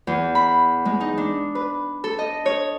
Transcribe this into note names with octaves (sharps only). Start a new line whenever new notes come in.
E2
B5
G#3
D#4
D4
B4
A4
D#5
C#5